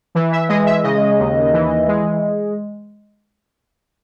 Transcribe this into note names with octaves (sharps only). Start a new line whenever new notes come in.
E3
E5
G#3 D#5
E5
C#3 D#5
D#2
E3
G#3